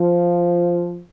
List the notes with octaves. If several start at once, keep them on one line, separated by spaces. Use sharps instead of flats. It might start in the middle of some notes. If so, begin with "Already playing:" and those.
Already playing: F3